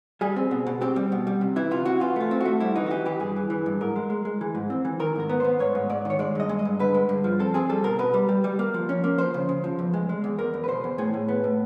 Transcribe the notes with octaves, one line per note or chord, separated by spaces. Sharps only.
G3 G#4
C4
B2
B2
C4 G4
G3
B2
G3
C3
E3 E4
C3 F4
C3 F#4
E3 F4
A3 F4
C4
A3 F#4
G3 E4
E3 D#4
F#4
E3 G4
E3 G4
G2 G#4
E3
E3
G2
G#2 A#4
G#3
G#3
G#3
E3
G#2
C4
E3
D#3 A#4
G#2 A#4
B3
B3 C5
G#2 C#5
G#2
G#2 D5
D#3
C#5
G#3 D5
G2 D#5
G#3
D#5
G2
D3 B4
G#3
G2
F3
C4 A4
C4 G#4
G3 A4
B2 A#4
B2 B4
G3
G3
G3
A#3
F3
C#4
A#3
F3 C5
C#3
C#3
F3
E2
G#3
G#3
E2
E2 A#4
E2
B4
B2 C5
E2
A2 G#4
A2
B3
A2